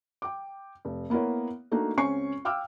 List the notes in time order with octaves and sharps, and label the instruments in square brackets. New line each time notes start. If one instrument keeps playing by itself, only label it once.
[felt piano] G5 D6
F1
A#3 B3 E4 A#4 C#5
A3 A#3 D4 D#4 F#4
C#2 C4 C#4 G#5 C#6 C7
F5 G5 D6 E6 F6